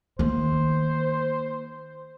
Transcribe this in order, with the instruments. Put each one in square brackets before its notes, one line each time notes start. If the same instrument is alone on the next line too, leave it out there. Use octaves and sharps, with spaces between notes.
[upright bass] D#3 A#3 [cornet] C5